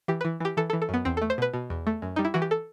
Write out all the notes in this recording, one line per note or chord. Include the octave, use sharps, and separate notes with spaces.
E3 G4
E3 B4
E3 G4
E3 A4
A4
E3
A4
F#2 B3
E2 C4
A3 A4
C5
B2 B4
B2
E2
A3
F#2
G3 D#4
E4
E3 F#4
G4
A4